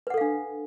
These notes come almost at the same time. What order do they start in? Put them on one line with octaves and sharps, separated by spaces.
B4 F#5 A4 F5 D4